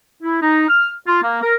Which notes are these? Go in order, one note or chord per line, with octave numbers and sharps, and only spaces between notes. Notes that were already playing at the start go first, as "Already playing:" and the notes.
E4
D#4
F6
F4
A#3
A#4